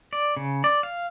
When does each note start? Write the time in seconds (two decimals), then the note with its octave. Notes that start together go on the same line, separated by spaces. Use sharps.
0.13 D5
0.37 C#3
0.64 D5
0.83 F5